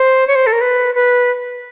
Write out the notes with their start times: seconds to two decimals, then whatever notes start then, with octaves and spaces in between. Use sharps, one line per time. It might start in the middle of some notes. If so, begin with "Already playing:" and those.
Already playing: C5
0.27 C#5
0.35 C5
0.47 A4
0.52 A#4
0.61 B4
0.95 B4